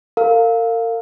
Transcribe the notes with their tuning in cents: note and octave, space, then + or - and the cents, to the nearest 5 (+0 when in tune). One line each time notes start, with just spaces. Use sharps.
A#4 -40 F5 +5